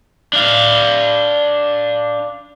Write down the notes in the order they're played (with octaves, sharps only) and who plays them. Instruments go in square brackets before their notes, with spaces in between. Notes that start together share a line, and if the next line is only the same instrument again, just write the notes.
[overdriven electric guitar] D4 F5